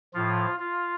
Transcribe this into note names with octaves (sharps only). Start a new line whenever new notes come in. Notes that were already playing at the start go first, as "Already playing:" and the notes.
A2 F3 F4
F4